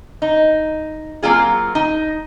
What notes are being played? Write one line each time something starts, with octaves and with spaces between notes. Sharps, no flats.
D#4
F#3 A#3 C4 F4 G#4
D#4